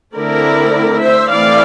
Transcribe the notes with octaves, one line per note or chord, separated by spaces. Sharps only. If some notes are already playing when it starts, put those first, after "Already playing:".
D3 A3 C4 E4 A#4 D5
C5 E5
E3 A3 C4 E4 D5 F5